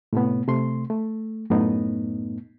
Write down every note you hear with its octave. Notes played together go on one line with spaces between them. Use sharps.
A2 C3 A3 B3
C3 A3 C6
A3
F#2 A2 A3 B3 D#4